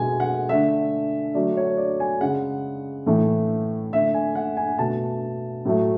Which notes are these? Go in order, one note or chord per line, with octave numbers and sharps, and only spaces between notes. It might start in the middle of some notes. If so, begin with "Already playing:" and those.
Already playing: B2 G#3 G#5
F#5
D3 A3 E5
D3 F#3 A3 D5
C#5
D5
G#5
C#3 G#3 F#5
A2 E3 A3
D3 A3 E5
G#5
F#5
G#5
B2 A3 A5
A2 F#3 A3